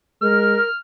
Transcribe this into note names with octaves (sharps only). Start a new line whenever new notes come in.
G#3 A#4 F6